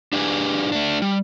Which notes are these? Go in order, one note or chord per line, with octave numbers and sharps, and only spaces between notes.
D4 G4 G#4 B4 G#5
A3 D4
G3